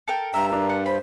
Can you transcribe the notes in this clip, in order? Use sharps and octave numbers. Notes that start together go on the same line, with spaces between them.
A4 A#4 G5
G2 E5 A#5
D4 A#4 A#5
F#5
C5 B5